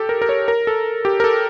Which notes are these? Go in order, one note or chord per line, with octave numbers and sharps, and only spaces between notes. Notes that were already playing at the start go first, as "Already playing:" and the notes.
Already playing: G4 A4
A#4
A#4
C#5
A#4
A4
G4
A#4
A4